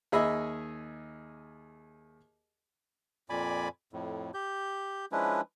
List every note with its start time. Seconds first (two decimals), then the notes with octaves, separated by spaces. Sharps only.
0.12 D#2 G#4 D#5 E5 B5
3.30 F2 A#2 D5 G#5 B5 D6
3.93 F2 A2
4.34 G4 G6
5.12 F3 G#3 C#4 D4 E4 B4